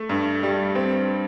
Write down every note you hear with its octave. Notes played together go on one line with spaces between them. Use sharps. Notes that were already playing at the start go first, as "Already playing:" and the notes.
Already playing: A3
G2
G3
C4